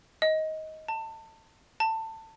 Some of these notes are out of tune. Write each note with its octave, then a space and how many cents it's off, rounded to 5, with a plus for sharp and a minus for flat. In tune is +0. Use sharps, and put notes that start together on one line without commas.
D#5 +15
A5 +25
A5 +20